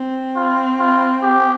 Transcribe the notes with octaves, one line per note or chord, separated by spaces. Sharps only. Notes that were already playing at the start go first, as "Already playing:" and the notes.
Already playing: C4
F4
F4
G4